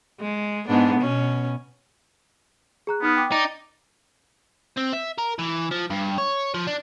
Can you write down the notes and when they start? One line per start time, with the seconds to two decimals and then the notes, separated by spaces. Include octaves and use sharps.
0.20 G#3
0.67 G#2 B3 D4
1.00 B2 C#4
2.87 G#4 A#5 F#6
3.02 B3 D#4 D#6 F6
3.16 G5 D6
3.32 D#4 D5
4.77 C4
4.93 E5
5.19 A#4
5.39 E3
5.71 F3
5.90 G2
6.18 C#5
6.54 F3
6.67 D4